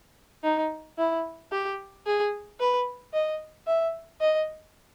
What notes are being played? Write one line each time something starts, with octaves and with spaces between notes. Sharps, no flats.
D#4
E4
G4
G#4
B4
D#5
E5
D#5